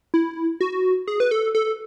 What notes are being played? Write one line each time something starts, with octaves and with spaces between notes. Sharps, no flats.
E4
F#4
G#4
B4
A4
A4